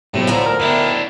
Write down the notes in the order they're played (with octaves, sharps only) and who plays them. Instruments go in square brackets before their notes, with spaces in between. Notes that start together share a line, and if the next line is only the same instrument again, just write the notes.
[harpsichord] B1 C3 [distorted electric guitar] A2
[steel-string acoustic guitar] D2 G#5 A#5 [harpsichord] D3 F3
[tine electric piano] A#4
[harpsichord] D#3 A3 B3 [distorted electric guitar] D4 E4